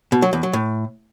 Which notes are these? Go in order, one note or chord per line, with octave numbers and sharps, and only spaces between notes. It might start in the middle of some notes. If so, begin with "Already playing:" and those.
B2
F#3
E2
F#3
A2